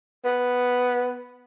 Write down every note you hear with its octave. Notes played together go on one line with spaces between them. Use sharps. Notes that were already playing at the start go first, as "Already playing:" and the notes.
B3